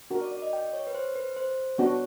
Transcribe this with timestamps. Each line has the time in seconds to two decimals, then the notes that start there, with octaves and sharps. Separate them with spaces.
0.10 D4 F#4 A#4
0.21 D5
0.32 D5
0.42 D#5
0.53 G5
0.73 C#5
0.87 B4
0.94 C5
1.16 B4
1.36 C5
1.78 B3 D4 F#4 C#5